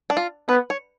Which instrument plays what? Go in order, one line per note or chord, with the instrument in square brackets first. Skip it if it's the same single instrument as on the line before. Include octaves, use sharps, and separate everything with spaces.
[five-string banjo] D4
F4
[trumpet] B3 [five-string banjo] B4
[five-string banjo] C#5